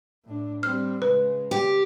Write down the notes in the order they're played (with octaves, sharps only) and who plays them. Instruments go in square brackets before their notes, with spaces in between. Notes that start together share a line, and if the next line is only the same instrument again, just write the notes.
[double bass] A2 D4
[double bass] G3 C4 [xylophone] F6
[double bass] C#3 G#3 [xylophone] B4
[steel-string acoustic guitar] G4